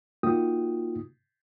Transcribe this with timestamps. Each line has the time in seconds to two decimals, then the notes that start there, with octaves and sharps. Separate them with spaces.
0.23 A#3 D#4 F4 F#4 G5 D#6